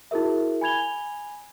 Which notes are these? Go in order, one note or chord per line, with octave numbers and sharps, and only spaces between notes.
E4 F#4 G#4 A#4 E5
G#5 B5 G#6 F7 G7